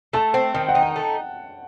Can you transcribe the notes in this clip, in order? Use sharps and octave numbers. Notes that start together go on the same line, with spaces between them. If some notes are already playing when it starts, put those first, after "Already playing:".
A3 A5
C4
D#3 G5
F#5
D#4
G5
A3